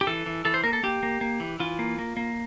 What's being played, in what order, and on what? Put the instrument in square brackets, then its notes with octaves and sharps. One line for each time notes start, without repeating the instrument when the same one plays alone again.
[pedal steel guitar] G4
E3 A4
E3
E3 A4
C5
A#3 A#4
A4
A#3 G4
A#3
A#3
E3
E3 F4
A#3
A#3
A#3